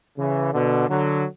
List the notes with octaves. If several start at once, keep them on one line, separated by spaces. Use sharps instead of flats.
C#3 E3
B2 D3
D3 F#3